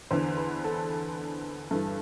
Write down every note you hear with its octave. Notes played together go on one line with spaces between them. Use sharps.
E2 D3 C5
B4
A4
G2 E3 A4